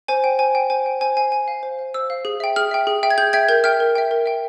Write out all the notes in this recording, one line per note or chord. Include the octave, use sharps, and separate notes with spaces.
C5 G#5
G5
C5 G#5
G5
C5 G#5
G5
C5 G#5
F5 G#5
C5 G#5
F5
C5
F5
C5 E6
F5
G#4
E5 G5
G#4 F6
E5 G5
G#4
E5 G5
G#6
G#4 G6
E5 G5 G#6
A#4 G6
E5 G5 F6
A#4
E5 G5
A#4
E5 G5